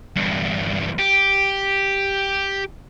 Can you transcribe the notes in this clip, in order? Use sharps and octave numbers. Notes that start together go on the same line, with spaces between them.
E2 G2
G4